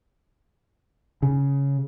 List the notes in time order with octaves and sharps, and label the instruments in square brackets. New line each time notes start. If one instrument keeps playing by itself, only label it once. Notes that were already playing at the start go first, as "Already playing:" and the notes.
[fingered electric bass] C#3